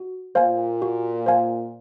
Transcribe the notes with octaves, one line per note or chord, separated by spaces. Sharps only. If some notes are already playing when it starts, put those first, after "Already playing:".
Already playing: F#4
A#2 C5 F5 G#5
F#4
C5 F5 G#5